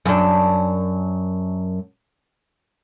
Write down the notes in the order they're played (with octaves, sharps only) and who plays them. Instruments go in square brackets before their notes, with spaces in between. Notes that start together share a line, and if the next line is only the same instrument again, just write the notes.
[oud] F#2 D4